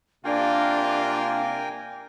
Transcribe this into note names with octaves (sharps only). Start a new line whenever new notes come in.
C3 A#3 D4 F4 A#4 G5 G#5